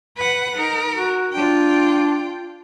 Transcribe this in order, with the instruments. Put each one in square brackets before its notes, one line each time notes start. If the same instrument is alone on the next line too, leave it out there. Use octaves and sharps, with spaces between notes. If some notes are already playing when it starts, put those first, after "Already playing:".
[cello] B4 F#5
[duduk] D#4 [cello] A#4
[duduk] F#4
[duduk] D4 [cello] F4 G5